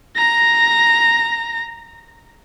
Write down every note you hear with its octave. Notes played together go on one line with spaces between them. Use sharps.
A#5 A#6